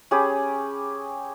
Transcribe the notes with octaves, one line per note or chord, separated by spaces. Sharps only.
C#4 G4 G#4 B5